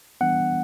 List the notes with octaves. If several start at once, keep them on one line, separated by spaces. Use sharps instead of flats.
E3 G3 B3 D4 F#5